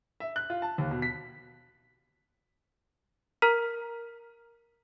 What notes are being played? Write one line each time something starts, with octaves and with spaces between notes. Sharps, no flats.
E5
F#6
F4
A5
D#2
B2
B6
A#4 A#5 F6 B6